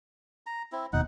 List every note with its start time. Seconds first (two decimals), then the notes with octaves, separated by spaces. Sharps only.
0.46 A#5
0.72 C4 E4
0.93 F1 D#2 B2 D#4 F#5